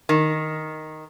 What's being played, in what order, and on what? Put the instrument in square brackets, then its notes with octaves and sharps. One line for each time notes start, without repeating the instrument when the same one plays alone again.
[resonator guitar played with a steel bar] D#3